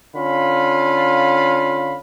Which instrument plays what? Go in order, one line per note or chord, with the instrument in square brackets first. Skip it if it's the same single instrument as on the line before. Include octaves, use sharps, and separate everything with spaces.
[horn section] D3 C#4 F4 F5 B5